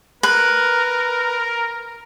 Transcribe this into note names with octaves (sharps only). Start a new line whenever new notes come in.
A#4 B4